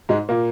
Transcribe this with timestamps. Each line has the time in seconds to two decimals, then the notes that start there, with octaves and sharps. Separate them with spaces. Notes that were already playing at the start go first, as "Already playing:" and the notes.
0.09 G#2 G#3
0.29 A#2 A#3